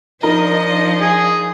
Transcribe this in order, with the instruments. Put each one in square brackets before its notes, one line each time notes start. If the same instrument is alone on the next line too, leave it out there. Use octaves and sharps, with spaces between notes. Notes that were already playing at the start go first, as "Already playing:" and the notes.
[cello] F3 [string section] D4 D#5 [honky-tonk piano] D#4 A#4
[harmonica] G#4